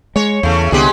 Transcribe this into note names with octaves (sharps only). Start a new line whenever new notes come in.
G#3 C#5
E2 C#3 A3
C2 D3 G#3 B3 G4 G#4